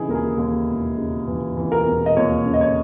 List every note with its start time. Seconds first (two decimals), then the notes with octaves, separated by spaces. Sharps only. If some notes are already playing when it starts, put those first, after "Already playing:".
Already playing: C#3 E3 D#4 E4 G#4
0.08 D#2 A#4
0.14 G#4
0.38 D#2
0.68 E1
0.97 C#3
1.27 E3
1.57 E3
1.72 A#4
1.86 E1
2.06 D#5
2.16 D#2 C#5
2.46 C#3
2.54 D#5
2.61 C#5